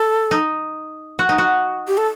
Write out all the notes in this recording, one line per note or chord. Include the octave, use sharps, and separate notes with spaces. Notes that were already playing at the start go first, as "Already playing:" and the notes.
Already playing: A4
D#4
F#4
D#4
F#4
G4
A4